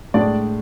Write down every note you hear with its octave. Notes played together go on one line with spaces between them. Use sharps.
A2 G#3 D4 D5